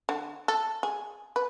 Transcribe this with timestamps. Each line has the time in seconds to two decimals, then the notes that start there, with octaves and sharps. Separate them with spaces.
0.09 D3
0.48 A4
0.83 G#4
1.36 B4